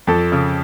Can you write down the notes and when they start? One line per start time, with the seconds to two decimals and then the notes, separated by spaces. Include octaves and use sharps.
0.07 F2 A4
0.32 C#3